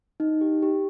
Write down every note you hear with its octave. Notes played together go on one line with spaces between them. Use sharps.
D#4
G4
G4